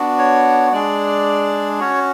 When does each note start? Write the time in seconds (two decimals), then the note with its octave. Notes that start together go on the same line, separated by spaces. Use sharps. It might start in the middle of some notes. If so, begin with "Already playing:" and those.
Already playing: B3 D4 F#4
0.19 C#5
0.72 G#3 D4 G#4 D5
1.80 C#4 F#4 C#5